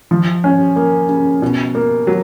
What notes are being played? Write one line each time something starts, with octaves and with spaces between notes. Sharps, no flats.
F3
C#4
A#3
C#3
B2
A#3
F#3